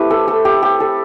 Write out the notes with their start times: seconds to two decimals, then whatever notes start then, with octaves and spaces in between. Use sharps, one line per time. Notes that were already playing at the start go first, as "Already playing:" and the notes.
Already playing: A3 C4 E4 G4 B4
0.11 A4
0.28 A4
0.45 G4
0.63 G4
0.80 A4